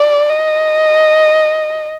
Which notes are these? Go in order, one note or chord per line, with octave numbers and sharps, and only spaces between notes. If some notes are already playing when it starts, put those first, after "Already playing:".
Already playing: D5
D#5